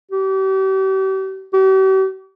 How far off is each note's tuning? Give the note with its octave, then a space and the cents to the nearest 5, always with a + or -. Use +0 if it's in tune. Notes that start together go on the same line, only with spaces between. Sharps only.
G4 -40
G4 -45